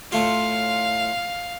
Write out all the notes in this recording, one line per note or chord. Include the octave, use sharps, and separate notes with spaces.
A2 A3 F4 F5